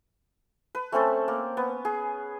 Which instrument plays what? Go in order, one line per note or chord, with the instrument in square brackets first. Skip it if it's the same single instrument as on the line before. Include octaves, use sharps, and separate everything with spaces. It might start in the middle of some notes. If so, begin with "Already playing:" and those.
[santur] B4
A3 C4 C#4 A4
A#3
B3
G#4